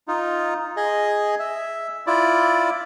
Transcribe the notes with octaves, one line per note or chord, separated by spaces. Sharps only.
D#4 F4
G#4 D#5
E5
E4 F4 D5